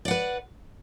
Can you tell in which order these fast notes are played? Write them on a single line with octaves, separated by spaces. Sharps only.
D5 F#5 B4